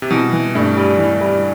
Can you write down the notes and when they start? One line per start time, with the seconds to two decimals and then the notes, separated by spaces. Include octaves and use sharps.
0.02 C3
0.10 B2 E3
0.33 E3
0.55 G2 A3
0.77 G3
0.98 E3
1.21 G3